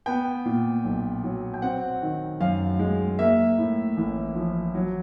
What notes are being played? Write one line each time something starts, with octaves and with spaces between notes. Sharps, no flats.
B3 G5
A#2
B1
F#3
G5
C4 F#5
D#3
F#2 F5
G#3
A#3 E5
A2
A1
F3
F#3